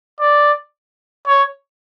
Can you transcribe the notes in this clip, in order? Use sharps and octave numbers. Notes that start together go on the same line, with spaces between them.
D5
C#5